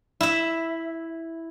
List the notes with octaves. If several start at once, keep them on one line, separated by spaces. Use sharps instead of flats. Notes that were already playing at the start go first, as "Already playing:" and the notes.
E4 E5